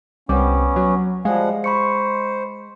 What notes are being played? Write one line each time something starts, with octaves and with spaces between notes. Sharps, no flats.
C2 G3 B3 C#4 D6
F#3
F3 G3 G#3 F5 F#5
C5 B5 C#6 C#7